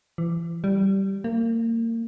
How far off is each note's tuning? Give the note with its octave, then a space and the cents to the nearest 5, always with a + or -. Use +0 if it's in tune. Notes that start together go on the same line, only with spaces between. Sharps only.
E3 +35
G3 -10
A#3 -30